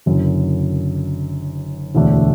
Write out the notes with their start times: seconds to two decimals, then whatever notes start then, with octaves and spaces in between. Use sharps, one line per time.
0.06 F#1 F#2 D3
1.95 E1 D2 D3 A3 D4